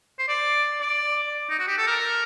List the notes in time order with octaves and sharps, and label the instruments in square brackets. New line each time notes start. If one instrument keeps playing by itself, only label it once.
[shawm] C5
D5
D5
D#4
F#4
G4
A4
A#4